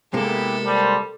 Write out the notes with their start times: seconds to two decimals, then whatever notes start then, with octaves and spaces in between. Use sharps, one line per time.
0.14 C3 G#3 A#3 B3 E4 G4 A4 A#4
0.66 G3 C5 G5 A5